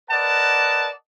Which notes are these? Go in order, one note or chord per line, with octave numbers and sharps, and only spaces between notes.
A#4 B4 D5 D#5 F#5 A5